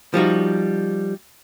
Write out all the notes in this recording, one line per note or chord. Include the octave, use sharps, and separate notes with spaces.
F3 G3 D#4 F#4